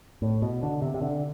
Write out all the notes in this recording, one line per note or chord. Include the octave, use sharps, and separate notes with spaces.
A2
B2
D3
C3
C3
D3